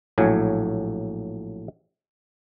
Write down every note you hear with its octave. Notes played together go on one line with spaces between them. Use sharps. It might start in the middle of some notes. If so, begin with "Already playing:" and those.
A#1 A2 F#3 G#5